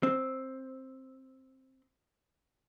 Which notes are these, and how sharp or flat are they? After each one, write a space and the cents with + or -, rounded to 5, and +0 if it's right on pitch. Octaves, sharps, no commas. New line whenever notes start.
C4 +10